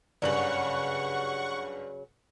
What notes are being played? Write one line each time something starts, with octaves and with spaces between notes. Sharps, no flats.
F#1 G2 C#3 F#3 D5 F#5 C#6 F#7